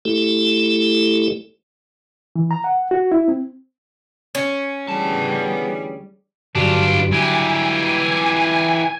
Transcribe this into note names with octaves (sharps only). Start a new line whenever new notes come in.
A3 E4 G4 A4
E3
A#5
F#5
F#4
E4
C4
C#4
D2 E3 G3 B3 G#4 A5
G2 D3 F#3 G3 D4 F4
E3 G4 G#5